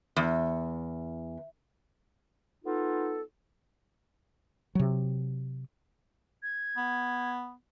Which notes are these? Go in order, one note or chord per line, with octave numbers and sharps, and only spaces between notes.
E2
B3 D#4 F4 A4
C3 F#3
G#6
B3